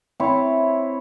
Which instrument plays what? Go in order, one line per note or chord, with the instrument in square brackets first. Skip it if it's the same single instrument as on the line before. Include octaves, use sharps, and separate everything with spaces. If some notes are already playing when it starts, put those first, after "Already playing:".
[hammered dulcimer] C4 E4 C#5